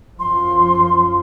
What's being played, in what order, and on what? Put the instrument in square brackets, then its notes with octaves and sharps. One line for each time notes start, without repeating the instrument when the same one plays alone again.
[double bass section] F#2 F3 [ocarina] C6